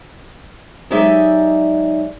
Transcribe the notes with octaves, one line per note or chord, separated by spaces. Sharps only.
F#3 G#3 D#4 G4 D5 E5